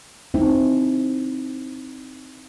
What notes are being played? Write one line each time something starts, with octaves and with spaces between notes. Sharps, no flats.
C4 D#4 E4